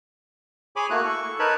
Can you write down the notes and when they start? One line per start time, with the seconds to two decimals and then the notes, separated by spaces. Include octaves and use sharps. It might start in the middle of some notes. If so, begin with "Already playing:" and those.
0.76 G#4 C#5 G#5 B5 D6
0.90 A3 A#3 E4 F#4 F#6
1.04 A4 C#6
1.39 D#4 A#4 B4 C#5 A5 B5